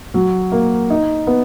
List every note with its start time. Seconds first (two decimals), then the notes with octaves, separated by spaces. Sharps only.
0.14 F#3
0.52 A#3
0.90 D#4
1.27 B3